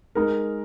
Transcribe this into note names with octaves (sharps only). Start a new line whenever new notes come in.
G#3 D#4 A#4